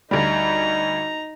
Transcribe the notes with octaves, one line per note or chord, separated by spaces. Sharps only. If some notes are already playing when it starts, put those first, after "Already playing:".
D2 G3 D#4 A#5